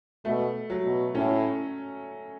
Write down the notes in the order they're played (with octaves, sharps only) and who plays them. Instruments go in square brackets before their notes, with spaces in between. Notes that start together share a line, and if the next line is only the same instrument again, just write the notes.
[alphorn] B2 [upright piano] A3
[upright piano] F#3
[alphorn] B2
[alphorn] A2 [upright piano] C#4